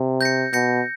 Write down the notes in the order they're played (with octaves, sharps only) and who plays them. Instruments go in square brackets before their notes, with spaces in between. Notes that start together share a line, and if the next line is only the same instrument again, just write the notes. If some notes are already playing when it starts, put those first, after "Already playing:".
Already playing: [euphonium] C3
[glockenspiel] G6 A#6 C#7
[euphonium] B2 [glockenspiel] G6 A#6 C#7